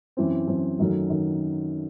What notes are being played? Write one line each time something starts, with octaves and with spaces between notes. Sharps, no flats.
F#2 E3 C4
F#2 E3 C4
F#2 D#3 F#3 A3 C#4
D#3